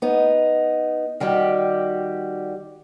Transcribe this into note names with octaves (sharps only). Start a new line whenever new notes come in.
B3 D#4
D#3 G3 F#4 G4